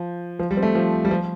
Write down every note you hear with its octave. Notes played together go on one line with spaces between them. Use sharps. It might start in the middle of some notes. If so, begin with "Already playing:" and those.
Already playing: F3
F3
G3
C4
A3
F3
G3
F3